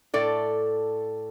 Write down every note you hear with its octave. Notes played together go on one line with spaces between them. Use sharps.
A2 A3 A4 D5